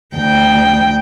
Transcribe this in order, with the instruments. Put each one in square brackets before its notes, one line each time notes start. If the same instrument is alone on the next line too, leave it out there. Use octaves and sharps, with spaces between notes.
[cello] D2 G5